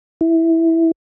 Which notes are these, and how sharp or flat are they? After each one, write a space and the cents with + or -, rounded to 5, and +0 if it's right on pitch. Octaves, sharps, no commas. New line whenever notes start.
E4 -5